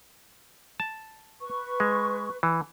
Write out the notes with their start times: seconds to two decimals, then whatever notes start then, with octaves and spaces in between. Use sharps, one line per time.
0.80 A5
1.41 B4 C#6
1.80 G#3
2.43 E3